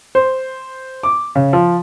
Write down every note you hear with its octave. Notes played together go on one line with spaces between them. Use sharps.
C5
D6
C#3
F3